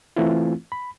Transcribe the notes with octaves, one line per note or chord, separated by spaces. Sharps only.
E3 A3 C4 E4 F4
B5